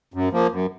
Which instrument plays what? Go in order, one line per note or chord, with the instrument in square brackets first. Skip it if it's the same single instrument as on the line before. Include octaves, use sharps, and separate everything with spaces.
[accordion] F#2
F3 A#3
F#2